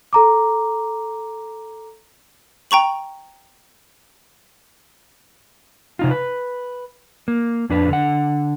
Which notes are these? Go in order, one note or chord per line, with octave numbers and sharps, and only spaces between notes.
A4 A#5 D6
G5 A#5 C#6 F#7
C3 D#4 F4
B4
A#3
F2 D4 B4
D3 F#5